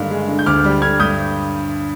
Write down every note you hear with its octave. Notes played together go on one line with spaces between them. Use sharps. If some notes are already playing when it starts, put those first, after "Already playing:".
Already playing: G2 D3 D#3 F5
G#3
D3
G6
D2 D6 F6
G3
D3 F6 G#6
G2 D#6 G6